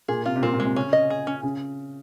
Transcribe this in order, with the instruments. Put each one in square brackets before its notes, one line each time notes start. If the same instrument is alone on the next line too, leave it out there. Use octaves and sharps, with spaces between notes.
[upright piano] A#2 [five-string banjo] G#4
[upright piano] C3 [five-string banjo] F4
[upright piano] C3
[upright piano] A#2 [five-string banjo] C4
[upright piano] A#2
[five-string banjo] G#3
[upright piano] C3
[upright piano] C#3 [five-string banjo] C#4
[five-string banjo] D#5
G#4
C#4
[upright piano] C#3